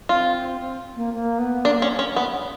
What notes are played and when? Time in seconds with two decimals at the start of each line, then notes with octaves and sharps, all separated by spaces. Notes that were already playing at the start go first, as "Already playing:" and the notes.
0.09 C4 F4
0.61 C4
0.95 A#3
1.13 A#3
1.38 B3
1.65 A#3 D4
1.82 C#4
1.99 C#4
2.16 B3